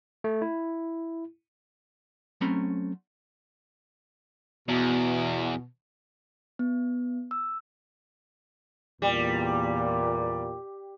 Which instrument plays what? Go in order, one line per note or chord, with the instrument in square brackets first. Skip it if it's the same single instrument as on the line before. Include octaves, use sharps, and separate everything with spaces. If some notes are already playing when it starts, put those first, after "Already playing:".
[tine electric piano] A3
E4
[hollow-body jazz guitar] F#3 A3 C4 C#4 A#5 B5
[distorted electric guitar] E2 [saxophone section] B2
[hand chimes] B3
E6
[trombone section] E2 A#2 [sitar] G3